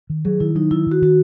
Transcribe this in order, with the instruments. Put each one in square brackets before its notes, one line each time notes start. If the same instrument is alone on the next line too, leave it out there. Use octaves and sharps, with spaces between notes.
[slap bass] D#3
[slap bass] F#3 [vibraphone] G#4
[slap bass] D#3 [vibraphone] E4
[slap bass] F#3 [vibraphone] D#4
[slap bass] D#3 [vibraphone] E4
[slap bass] D#3 [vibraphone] F#4
[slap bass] D#3 [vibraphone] F#4